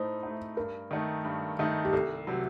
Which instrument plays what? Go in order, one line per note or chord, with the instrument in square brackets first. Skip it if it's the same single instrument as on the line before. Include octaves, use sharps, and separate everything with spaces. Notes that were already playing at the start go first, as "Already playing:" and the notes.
Already playing: [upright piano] A2 A3 D#4 [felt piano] C5
[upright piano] A3 D#4
[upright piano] G2 [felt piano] A#4
[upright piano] D#3 A3 D#4
G2
D#3 A3 D#4
[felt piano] G4
[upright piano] C2 [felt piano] A4
[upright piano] C3 F#3